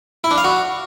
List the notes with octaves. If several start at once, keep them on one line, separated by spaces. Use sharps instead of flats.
E4
D4
F5
F#4